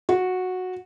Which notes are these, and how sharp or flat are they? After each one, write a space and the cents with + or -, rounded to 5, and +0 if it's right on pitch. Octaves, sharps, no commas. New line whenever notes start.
F#4 -10